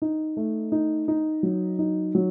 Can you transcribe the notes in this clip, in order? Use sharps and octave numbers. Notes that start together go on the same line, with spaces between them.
D#4
A3
D#4
D#4
F#3
D#4
F#3